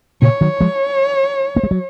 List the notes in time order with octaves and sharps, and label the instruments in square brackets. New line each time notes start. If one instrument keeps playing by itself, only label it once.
[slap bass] A#2 C#3 [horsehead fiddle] C#5
[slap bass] D#3 F#3
F3 G#3
A#3
G#3
F#3